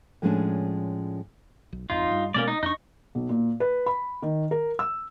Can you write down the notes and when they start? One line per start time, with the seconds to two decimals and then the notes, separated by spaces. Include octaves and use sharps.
0.22 A2 F3 G#3 C#4 D4
1.73 B1
1.90 D#1 G#1 F2 D#4 F4
2.11 G2
2.34 B2 G#3 A#3 C#4 D5
2.48 D#4
2.63 F2 D4 D#4 C#6
3.15 B1
3.29 A#2
3.60 B4
3.86 B5
4.22 D#3
4.51 A#4
4.79 E6